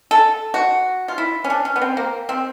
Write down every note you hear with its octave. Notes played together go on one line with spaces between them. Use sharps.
A4
F#4
F4
E4
C#4
D4
C#4
B3
C4
A#3
C4